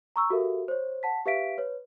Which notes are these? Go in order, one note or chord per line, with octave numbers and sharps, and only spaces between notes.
A#5 C#6 E6
F#4 G4 A4 A#4 E5 F5
C5 C#5
F#5 A5 B6
G4 B4 E5 F5 B6 D7
B4 C#5